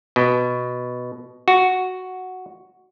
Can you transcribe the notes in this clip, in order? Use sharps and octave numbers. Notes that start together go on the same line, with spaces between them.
B2
F#4